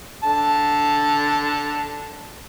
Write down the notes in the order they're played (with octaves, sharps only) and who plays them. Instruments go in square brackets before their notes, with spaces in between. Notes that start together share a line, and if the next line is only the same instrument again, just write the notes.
[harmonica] D3 A5